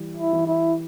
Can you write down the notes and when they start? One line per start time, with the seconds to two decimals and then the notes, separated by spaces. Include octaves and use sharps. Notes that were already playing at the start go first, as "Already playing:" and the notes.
Already playing: E3 G3
0.17 E4
0.33 E3
0.47 E4